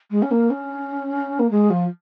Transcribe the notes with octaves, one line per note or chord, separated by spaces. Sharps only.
G#3
C#4
A#3
C#4
A#3
G#3
F3